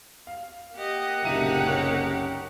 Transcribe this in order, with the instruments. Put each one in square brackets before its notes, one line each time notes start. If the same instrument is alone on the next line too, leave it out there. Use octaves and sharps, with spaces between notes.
[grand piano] F5
[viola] A#3 F#5 [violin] G4 D#5
[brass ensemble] F#1 C2 A4 [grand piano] A#2 E5 D#7 [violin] D#4 G4
[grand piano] C#4